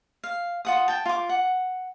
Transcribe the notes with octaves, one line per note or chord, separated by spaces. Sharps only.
F5
F4 F#5 D#6
G5 A5
F4 D6
F#5